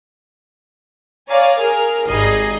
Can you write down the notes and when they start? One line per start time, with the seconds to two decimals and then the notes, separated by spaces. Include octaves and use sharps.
1.29 C#5 D5 F5 G#5 A#5
1.58 G#4 A#4 F6
2.07 G#1 G3 D#4 G#4 D#5 C7